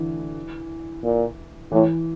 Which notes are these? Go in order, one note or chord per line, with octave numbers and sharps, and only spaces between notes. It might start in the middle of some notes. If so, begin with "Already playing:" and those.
Already playing: D3 E3
A#2
A2 E3